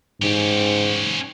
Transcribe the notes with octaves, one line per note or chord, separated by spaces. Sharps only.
G#2 C#4 G4